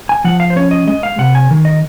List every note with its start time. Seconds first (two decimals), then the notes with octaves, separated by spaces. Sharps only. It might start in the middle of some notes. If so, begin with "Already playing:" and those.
0.09 G#5
0.24 F3 F#5
0.40 F5
0.50 C5
0.56 C#4 C#5
0.71 D#5
0.87 G#3 D#5
1.03 F5
1.18 C3 F#5
1.35 G#5
1.51 D#3
1.65 D#5